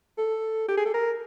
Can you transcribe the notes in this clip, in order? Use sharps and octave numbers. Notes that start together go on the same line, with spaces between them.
A4
G4
G#4
A4
A#4